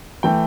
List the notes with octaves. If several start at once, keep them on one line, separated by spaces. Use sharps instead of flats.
E3 A3 G5